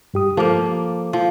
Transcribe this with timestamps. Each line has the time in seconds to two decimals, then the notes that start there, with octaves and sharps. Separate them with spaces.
0.14 G2 G4 D#6
0.37 F3 A#3 A4 D6
1.13 F3